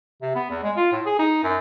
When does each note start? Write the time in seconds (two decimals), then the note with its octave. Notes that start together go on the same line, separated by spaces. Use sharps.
0.22 C3
0.36 B3
0.50 E2
0.63 G#3
0.77 F4
0.92 A2
1.06 G#4
1.19 D#4
1.43 F#2